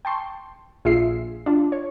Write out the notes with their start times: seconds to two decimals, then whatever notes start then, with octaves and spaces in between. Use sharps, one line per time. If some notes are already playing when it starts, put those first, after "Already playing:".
0.05 G5 A5 C6 C#6
0.85 A#1 F4 G#4 E5 C7
1.46 D4 F4
1.72 C#5